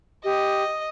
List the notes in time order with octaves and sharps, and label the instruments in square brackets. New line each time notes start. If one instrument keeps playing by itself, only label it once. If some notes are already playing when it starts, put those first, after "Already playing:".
[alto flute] G4 [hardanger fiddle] D#5